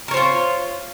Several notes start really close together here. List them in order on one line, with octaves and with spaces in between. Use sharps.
A#4 C#5 C5 F4